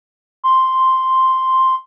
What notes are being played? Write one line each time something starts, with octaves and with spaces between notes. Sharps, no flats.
C6